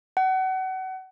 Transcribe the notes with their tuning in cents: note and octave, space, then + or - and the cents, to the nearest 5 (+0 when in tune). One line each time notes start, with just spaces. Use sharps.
F#5 +30